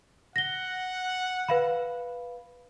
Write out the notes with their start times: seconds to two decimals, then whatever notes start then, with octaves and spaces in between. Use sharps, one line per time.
0.36 F#5 A#6 G7
1.49 B4 F5 B5